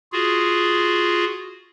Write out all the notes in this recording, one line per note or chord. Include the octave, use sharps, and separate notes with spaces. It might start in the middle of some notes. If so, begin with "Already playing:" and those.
F4 F#4 G#4